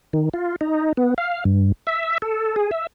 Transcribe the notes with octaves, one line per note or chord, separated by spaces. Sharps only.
D#3
F4
D#4
B3
F5
G2
E5
A4
G#4
E5